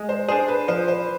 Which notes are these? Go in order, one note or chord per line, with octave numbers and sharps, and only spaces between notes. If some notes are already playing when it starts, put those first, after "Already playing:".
Already playing: G#3
C5
D4 G#4 C5
B4
F3 C5
C5